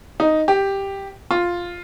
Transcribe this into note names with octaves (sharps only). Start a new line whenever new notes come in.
D#4
G4
F4